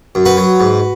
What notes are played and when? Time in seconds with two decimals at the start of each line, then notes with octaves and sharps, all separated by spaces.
0.15 F#2
0.25 F#4 B4
0.37 F#3
0.60 G#2